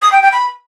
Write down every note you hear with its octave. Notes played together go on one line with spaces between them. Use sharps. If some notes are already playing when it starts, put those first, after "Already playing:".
D#6
G5
G5
B5